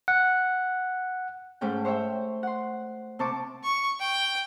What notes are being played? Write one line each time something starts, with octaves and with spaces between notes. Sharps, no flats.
F#5
G#2 A3 C#4 G5
C5 C#5 E5 G5
F#5 C6
C3 C4 A5 C#6 D6
C#6
G5